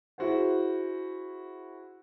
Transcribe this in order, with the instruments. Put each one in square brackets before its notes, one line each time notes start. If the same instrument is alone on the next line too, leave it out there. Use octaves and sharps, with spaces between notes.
[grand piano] E4 F#4 G#4 C5 F#5